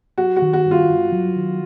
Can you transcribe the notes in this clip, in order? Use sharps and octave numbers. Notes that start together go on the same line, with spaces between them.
F#3 F#4
F#4
D#3
F#4
G2
F4
G2
F#3
D#3